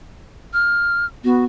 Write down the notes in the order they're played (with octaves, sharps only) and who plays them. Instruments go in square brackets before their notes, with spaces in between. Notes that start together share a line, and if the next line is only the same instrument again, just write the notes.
[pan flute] F6
[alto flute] B3 [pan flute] F#4